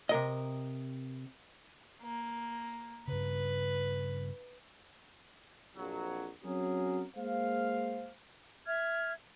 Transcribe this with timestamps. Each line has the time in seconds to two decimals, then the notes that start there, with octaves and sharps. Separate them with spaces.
0.09 C3 A#4 D#5
2.02 A#3
3.08 G2 C#3 B4
5.76 A#1 F2 F#3
6.44 F#3 C4 C#4 F#4 G#4 A#4
7.17 G#3 A#3 C5 F5
8.66 E5 F6 G#6